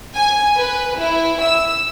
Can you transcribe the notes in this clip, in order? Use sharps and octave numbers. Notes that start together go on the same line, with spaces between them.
G#5
B4
E4
E6